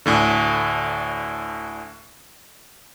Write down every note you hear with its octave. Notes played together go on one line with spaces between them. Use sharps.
D2 A2 D3